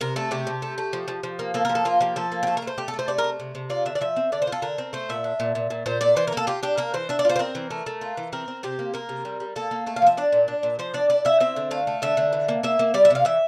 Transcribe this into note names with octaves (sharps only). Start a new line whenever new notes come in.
C3 A#4
A3 A4
C3 G4
C3
A3
A3
F3
F3
F3
A#3
A#3 A4
F3 A#4
A4
A#3 F4
F3 G4
F3 A4
A#3
G4
A3 A4
A#4
A3
C5
A3 G4
A4
A3
C5
C3 D5
A#4
A3
C3
C3
F4 D5
D3 E5
D5
F3 E5
C4
D3 D5
C5
F4
A4
D3 A#4
C4
A3 C5
A#2 E5
D4
A#2
A#2
A#2
A#2 C5
A#2 D5
E3 C5
A#4
A#3 A4
F4 G4
D4 G4
A#3 A#4
E3 C5
D4 E5
D5
F4 C5
C5
C4 A#4
E3
A3
A3
F4
E3
C4 A#4
C4
C3 G4
A#3
A#3 A#4
C3
G3
G3
A#3 A4
A#3
A3 A4
F5
F3 E5
D4 D5
A#2
D4
A#2
F3 C5
D4 D5
E4 D5
E4 E5
C4 E5
D3
A3 F5
A3
D3 E5
D3
E3
A#3
A#3 E5
A#3
G3 D5
E5
C3 F5
E3 E5